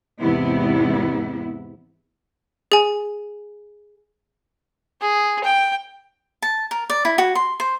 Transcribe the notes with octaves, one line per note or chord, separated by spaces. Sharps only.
E2 G#2 C3 B3 E4
G#4 G#5
G#4
G5
A5
A#4
D5
E4
F#4
C6
C5